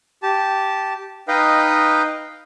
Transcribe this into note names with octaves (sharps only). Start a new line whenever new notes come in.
G4 A5
D#4 B4 D#5 F5 G5